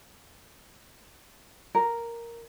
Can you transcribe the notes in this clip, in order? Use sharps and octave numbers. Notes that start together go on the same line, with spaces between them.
A#4